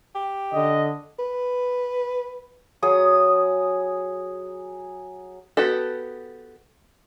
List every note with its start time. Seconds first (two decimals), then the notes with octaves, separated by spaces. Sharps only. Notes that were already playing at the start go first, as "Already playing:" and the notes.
0.15 G4
0.53 D3 D#5
1.19 B4
2.82 F#3 G#4 D#6
5.57 B3 F#4 G4 A4